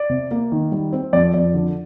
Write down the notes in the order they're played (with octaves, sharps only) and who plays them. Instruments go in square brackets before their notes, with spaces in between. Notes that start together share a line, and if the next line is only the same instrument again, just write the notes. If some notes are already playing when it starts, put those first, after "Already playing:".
Already playing: [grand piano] D5
C3
A#3
D#3
G3
C4
F2 D5
F2 D5
D3